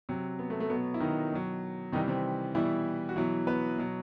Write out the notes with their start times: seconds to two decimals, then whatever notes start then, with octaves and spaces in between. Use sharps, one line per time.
0.09 C3 F#3
0.39 B3
0.50 A3
0.60 A3
0.70 B2 F#3 B3
0.94 E4
1.00 D#3 D#4
1.32 B2 F#3
1.92 C3 D#3 E3 G3 D#4
2.08 C3 C4
2.55 B2 E3 G3 E4
3.09 F#4
3.16 B2 E3 F#3 E4
3.47 B3 B4
3.78 B2 F#3